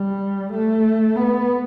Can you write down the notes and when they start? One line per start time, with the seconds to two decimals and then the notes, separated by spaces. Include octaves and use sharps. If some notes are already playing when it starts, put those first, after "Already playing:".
Already playing: G3
0.52 A3
1.15 B3